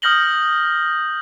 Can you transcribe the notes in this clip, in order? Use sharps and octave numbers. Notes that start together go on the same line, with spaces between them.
D#6 F6 G6 A#6 F#7 G7